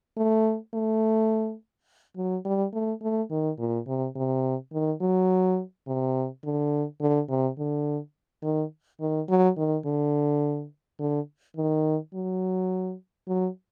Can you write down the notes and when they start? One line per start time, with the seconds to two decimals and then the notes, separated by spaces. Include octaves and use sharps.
0.17 A3
0.74 A3
2.17 F#3
2.45 G3
2.73 A3
3.02 A3
3.30 D#3
3.59 A#2
3.87 C3
4.16 C3
4.73 D#3
5.01 F#3
5.87 C3
6.44 D3
7.01 D3
7.29 C3
7.58 D3
8.43 D#3
9.01 D#3
9.29 F#3
9.57 D#3
9.86 D3
11.00 D3
11.57 D#3
12.14 F#3
13.28 F#3